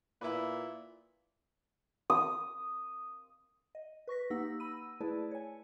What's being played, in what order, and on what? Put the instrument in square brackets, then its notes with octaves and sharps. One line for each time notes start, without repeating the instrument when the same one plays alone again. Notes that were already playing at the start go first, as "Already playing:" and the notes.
[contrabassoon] A#2 [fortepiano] E4 B4
[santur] D#6
[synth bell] D#5
B4 C#6 A#6 B6
A#3 D#4 G4 F#5 E6 A#6
B5 E6 D#7
A3 E4 G#4 B4 D5 A5
C#5 G#5